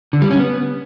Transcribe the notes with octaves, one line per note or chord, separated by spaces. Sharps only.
D3
G3
C#4
B3